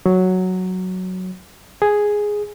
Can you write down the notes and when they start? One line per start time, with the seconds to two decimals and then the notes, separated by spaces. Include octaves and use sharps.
0.06 F#3
1.82 G#4